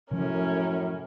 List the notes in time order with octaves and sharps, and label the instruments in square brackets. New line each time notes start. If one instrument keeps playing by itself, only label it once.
[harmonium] F#2 A2 [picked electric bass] C3 F3 [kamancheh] C#4 A#4